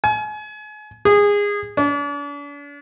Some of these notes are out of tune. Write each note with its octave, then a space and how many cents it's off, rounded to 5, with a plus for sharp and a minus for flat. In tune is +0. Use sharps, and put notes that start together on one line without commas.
G#5 +35
G#4 -20
D4 -40